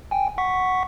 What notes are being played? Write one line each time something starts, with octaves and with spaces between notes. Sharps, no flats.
G5 G#5
F#5 C#6 B6